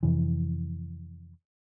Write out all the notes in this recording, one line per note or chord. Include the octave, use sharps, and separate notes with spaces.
F2 C3 E3